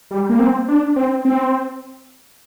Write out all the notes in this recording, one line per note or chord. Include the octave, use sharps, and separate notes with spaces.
G3
A#3
C4
D4
C4
C4